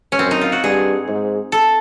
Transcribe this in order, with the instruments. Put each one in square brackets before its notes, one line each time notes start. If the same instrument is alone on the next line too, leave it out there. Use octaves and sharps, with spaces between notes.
[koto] C#4
[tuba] F#2 [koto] C4
[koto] D#4
F4
F#4
[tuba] G2 [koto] G#4
[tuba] G#2
[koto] A4